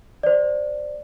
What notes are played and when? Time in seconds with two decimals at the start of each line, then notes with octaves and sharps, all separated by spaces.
0.23 C5 D5